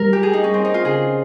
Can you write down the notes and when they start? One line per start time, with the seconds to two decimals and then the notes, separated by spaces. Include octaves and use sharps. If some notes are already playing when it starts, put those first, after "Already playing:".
Already playing: G3 A#4
0.13 G4
0.23 G#4
0.33 D#4
0.44 C#4
0.54 C4
0.65 D#4
0.74 F4
0.85 C#3 G#4